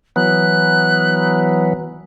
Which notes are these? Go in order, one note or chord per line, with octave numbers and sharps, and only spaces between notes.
E3 F#3 B3 F#6